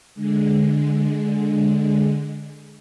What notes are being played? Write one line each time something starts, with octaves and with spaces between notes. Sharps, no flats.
D3 G#3